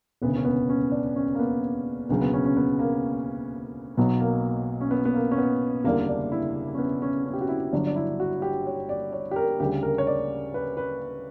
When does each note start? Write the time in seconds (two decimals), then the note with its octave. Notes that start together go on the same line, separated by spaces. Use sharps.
0.22 E1 D2 C#3 B3
0.36 C#4
0.45 B3
0.69 C#4
0.92 D4
1.16 C#4
1.35 A#3
1.39 B3
2.09 E1 D2 C#3 F#3 B3
2.21 B3
2.33 C#4
2.45 C#4
2.57 B3
2.79 A#3
3.97 B1 B2 F#3 B3
4.20 A#3
4.81 C#4
4.91 B3
5.05 B3
5.14 A#3
5.31 C#4
5.38 B3
5.84 F#1 E2 D3 G3 A#3
6.09 D4
6.32 E4
6.74 C#4
6.78 B3
7.02 C#4
7.26 C#4
7.33 G4
7.41 F#4
7.49 E4
7.73 G1 G2 F#3 D4
7.86 D4
7.96 E4
8.20 F#4
8.42 G4
8.67 C#5
8.89 D5
9.13 C#5
9.31 G4
9.36 A#4
9.60 D2 C#3 G3 G4
9.83 A#4
9.98 C#5
10.07 D5
10.54 B4
10.77 B4